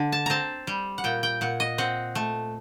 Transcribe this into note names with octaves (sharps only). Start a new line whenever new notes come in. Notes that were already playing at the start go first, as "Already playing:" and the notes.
Already playing: D3
A5
C4 A5 A#5
G3
F#5
A#2 G5
G5
A#2 F#5
D#5
C4 F#5
A3